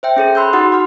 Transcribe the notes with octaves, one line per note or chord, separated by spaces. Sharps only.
C5 E5 G5
C#4 G#4 A4
B5 C6 E6 F#6 G6
D#4 F#4 F#5 D#6
F#5 F6